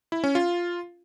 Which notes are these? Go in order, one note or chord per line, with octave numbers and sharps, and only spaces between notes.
E4
C#4
F4